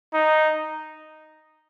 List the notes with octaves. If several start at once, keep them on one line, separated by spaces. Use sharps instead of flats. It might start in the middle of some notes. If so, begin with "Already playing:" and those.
D#4